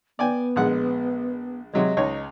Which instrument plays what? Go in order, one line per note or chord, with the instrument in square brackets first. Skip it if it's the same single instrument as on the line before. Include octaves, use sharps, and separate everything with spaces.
[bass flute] B3 [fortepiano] D5 G5 G#5
[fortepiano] A#1 G#3 F#5
[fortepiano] C3 F#3 G#3 [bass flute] D#5
[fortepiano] C#2 D#4 C#5